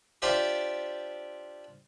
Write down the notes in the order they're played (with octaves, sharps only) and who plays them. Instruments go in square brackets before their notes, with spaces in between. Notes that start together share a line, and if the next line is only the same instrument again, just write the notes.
[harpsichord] D4 F4 G4 C5 D5 E5